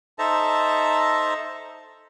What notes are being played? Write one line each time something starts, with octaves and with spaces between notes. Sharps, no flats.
D#4 A4 C5 E5 A5 A#5